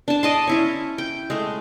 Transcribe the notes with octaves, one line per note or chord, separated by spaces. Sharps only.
D4 A5
D5 D#5 A5 C6
C#4 E4 C#5
G5
G#3 A3